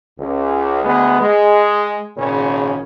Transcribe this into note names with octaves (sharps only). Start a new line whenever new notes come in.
C#2
D2 G#3 B3
G#3
G#1 A#2 C#3 C#4